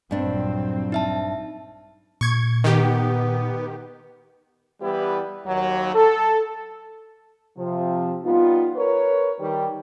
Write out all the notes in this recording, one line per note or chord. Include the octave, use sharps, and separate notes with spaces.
A#1 G2 F#3 C4 D4
D#4 E5 A5
A#2 C#6 G#6
D#3 B3 G4
E3 G3 B3 E4 G4 B4
D#2 F#3
A4
C3 F3
G3 B3 D#4 F4
A#4 B4 C#5
D#3 G3